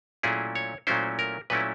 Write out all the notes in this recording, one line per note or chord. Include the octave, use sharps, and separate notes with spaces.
A#2 F#3 A3 C#4 E4 G#4
C#5
A#2 F#3 A3 C#4 E4 C5
A#4
A#2 F#3 A3 C#4 E4 B4